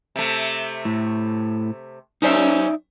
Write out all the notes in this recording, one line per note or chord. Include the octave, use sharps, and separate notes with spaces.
C3 A3
A2
F#2 C#4 D#4 C5 D5 E5